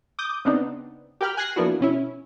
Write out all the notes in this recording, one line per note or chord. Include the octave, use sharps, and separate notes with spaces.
D6 D#6 G6
C#3 B3 C4 D4 D#4
G4 A#4 G5 B5 F6
G#5 F#6 G#6 A#6 C7
F3 A#3 B3 D4 E4 F#4
B2 C#4 E4